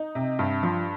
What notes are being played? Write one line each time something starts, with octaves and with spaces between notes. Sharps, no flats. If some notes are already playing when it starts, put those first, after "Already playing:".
Already playing: D#4
C3
G2
F3